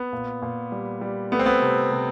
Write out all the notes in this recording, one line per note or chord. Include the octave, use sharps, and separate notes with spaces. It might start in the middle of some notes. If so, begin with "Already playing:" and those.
Already playing: B3
A#2
A#2
G3
G3
A3 B3
C4
B3
C3
C3